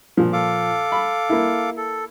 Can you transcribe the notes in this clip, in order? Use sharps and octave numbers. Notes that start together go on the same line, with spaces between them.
A#2 F3
A4 F5 D6
B5
A#3 E4
A4